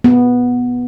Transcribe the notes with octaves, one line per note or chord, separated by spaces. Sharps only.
B3